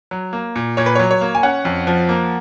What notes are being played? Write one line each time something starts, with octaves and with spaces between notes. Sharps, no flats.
F#3
A#3
A#2
A#2 C#5
B4
F#3 C#5
C#5
A#3
G#5
C#4 F#5
F2
F3
A#3